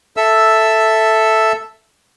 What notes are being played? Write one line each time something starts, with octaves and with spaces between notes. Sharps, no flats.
A4 E5 E6